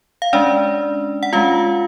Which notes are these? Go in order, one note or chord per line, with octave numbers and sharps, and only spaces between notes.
F5
G#3 C#4 D4 D5
F#5
G#3 C#4 F4 F5